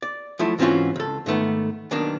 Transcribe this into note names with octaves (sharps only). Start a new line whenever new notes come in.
D5
F3 F#3 A3 E4
G#2 E3 C4 C#4 F4 F#4
C#2 A4
G#2 D#3 A3 B3
B1 B2 D#3 A#3 D4